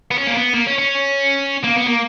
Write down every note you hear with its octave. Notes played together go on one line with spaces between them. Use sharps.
B3
C#4
A#3
B3
A#3
C#4
C#4
A#3
B3
A#3